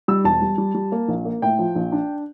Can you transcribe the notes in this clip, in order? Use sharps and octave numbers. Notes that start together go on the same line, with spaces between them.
G3 E6
E1 A5
G3
G3
G3
A#3
A#1
A#3
A2 G5
F3
A#1
D4